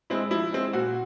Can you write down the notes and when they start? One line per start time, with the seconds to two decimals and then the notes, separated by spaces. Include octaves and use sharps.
0.10 G#3 C4 E4
0.31 F3 E4
0.52 G#3 C4 E4
0.73 A#2 F#4